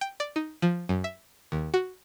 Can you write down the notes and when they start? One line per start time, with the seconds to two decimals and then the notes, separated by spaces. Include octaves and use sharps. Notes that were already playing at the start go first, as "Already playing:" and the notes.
0.01 G5
0.20 D5
0.36 D#4
0.62 F3
0.89 F#2
1.04 E5
1.52 D#2
1.74 F#4